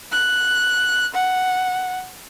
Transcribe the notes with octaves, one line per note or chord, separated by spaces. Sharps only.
F#6
F#5